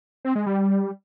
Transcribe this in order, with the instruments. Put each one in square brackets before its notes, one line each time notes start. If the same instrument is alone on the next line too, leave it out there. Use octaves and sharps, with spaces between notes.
[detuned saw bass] C4
G#3
G3